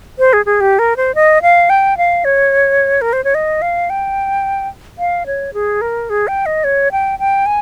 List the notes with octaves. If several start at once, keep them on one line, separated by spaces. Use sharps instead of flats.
C5
G#4
G#4
G4
A#4
C5
D#5
F5
G5
F5
C#5
A#4
C5
C#5
D#5
F5
G5
F5
C#5
G#4
A#4
G#4
G5
D#5
C#5
G5
G5
G#5